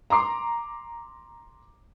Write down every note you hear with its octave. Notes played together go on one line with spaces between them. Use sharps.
A#5 C6 D6 C7